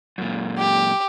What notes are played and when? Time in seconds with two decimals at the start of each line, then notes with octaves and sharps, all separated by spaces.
0.18 F#2 A#2
0.57 G4